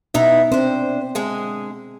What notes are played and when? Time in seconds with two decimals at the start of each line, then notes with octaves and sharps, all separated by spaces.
0.14 B2 B3 D#4 E4 E5
0.52 C4 D4 C5
1.15 D3 G#3 G#4